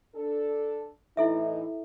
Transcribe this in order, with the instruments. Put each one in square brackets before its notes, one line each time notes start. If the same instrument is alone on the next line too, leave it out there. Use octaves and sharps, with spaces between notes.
[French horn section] D4 A4
[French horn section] A2 E3 D#4 [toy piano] E4 A4 E5